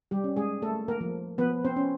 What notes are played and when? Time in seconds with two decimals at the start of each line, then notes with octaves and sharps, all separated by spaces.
0.11 G3 G4
0.24 C#4
0.36 G#3 G#4
0.62 A3 A#3 A4
0.88 A#3 A#4
1.01 F3
1.38 F3 B3 B4
1.64 C4 C5
1.76 C#4